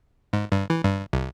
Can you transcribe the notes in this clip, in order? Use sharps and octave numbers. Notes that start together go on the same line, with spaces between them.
G#2
G2
E3
G2
C2